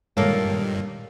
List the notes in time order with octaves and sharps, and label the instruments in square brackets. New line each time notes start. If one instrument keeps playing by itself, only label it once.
[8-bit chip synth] G2 A#2 D#3 [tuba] G3 [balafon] G#3 C#5 [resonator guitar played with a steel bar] A#3 A4